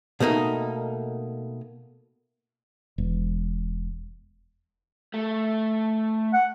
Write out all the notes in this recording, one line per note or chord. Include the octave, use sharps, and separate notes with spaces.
B2 A3 A#3 D#4
E1
A3
F#5